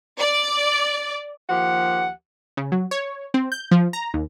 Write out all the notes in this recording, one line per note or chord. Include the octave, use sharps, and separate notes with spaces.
D5
D#2 F3 G4 F#5
C#3
F#3
C#5
C4
G6
F3
A#5
D#2